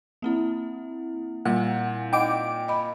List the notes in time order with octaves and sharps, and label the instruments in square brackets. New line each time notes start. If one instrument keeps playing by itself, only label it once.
[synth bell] A#3 C4 E4
[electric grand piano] A#2 [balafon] G3 [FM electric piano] F#5
[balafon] D#4 D#5 F#5 [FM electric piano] G5 D6
[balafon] D#5 B5